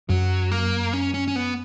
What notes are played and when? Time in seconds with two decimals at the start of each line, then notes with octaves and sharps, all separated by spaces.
0.09 F#2 F#3
0.51 A#3
0.93 C#4
1.14 C#4
1.28 C#4
1.36 B3